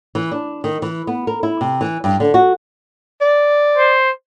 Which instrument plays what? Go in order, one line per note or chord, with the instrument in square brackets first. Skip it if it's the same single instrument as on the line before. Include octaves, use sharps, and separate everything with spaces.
[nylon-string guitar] E3
D4
D#3
E3
B3
A#4
E4
C3
E3
G2
D3
F#4
[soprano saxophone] D5
[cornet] C5